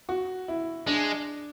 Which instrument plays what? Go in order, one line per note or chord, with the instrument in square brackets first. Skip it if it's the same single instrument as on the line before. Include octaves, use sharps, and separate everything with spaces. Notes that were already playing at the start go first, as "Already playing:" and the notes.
[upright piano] F#4
E4
[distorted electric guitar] G#3 [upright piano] D4